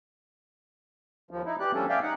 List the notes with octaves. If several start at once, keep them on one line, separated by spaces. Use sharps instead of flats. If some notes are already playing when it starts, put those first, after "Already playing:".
D#2 F3
D#4 E4
E3 G4 D5 F#6
D2 F3 G3 C#4 D4 A4
G#4 D5 E5 F5 G5
D#4 F#5